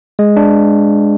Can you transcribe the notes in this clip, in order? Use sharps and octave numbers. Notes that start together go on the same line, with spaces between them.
G#3
D4